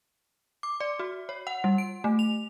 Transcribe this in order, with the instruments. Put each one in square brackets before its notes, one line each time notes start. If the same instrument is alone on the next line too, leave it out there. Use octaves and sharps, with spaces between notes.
[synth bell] D6
D5
F#4
C#5
F#5
G3
D7
A3
F7